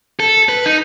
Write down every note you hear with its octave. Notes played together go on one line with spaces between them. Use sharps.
A4
B4
D#4